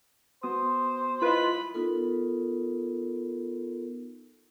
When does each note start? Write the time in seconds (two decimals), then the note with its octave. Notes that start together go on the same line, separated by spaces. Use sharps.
0.43 B3 F#4 C5 D#6
1.22 E4 F4 B4 D#5 B5
1.74 B3 D#4 F4 A4 A#4